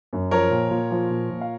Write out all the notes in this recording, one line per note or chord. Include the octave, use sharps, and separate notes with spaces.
F#2
F3 A#4 C#5
A#2
A#2
F3
A#2
A#2
F5